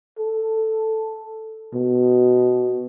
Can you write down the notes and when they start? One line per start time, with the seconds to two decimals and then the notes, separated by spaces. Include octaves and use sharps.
0.19 A4
1.74 B2